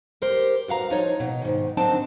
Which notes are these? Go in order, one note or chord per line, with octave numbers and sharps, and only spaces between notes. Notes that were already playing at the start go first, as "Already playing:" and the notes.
G4 A#4 C5
G2 F#4 F5 A#5
F3 D#4 C#5
B2
G#2 D#3
D#3 F#3 C4 D4 D#4 A5